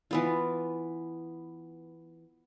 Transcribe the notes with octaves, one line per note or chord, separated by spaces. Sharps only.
E3 B3 F4